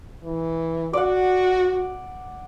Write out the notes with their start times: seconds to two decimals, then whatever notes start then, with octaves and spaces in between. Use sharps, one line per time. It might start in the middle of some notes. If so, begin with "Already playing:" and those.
0.24 E3
0.93 F#4 D5 F#5